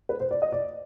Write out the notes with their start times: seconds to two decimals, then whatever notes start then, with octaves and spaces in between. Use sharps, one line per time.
0.09 B4
0.20 C5
0.31 D5
0.42 D#5
0.52 D5